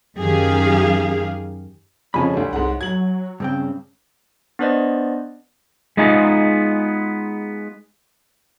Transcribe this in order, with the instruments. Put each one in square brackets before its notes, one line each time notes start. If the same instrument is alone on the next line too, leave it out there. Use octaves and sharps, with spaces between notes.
[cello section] F#2 D#3 G4 G#4 F5
[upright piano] F2 C#3 F3 [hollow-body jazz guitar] C#5 G#5 B5
[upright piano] D2 G3
[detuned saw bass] C2 [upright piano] G#2 F#5
[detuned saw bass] F#3 [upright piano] G#6 F#7
[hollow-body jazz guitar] G2 C4 G5 [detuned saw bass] C#3
[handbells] B3 D4 B4 C5 D5 D#5
[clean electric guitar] G#3 B3 D#4 F4 G#4